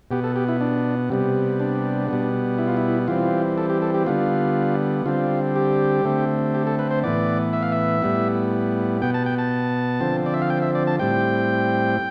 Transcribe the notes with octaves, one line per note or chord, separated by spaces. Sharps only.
B2 B3 G4
A4
G4
E4
D4
C3 G3 B3
D4
B2 G3 B3
E4
F4
E4
E3 G3 C4 F4
A4
G4
A4
G4
D3 G3 B3 F4
D3 G3 C4 F4
G4
D3 A3 C4
G4
A4
B4
C5
A2 E3 B3 D5
E5
F5
E5
A2 G3 B3
B2 B3 G5
A5
G5
A5
D3 F3 C4
D5
E5
F5
G5
E5
D5
A5
A2 G3 C4 G5